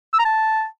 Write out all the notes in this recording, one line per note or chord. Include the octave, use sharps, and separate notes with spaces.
E6
A#5
A5